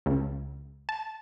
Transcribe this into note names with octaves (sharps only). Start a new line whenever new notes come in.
C#2
A5